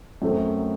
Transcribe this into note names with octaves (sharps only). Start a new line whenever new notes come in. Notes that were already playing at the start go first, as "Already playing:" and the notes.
F#2 F#3 A3 C4